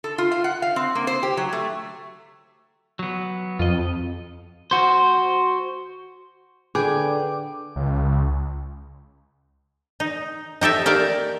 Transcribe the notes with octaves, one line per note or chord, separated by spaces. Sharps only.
A4
F4
F5
F#5
F5
C4
A#3
C5
G4
F#3
A3
F#3 B3
F2 F4 D#5
F#4 C5
D3 G#4 B4 G5 D6
C#2
D#4
D#4 G4 A4 E5
A#3 G4 A#4 D5